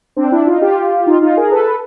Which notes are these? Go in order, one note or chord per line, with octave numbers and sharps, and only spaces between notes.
C4 D4
D4 E4
D#4 F4
F4 G4
D#4 F4
D#4 F4
G#4 A#4
A4 B4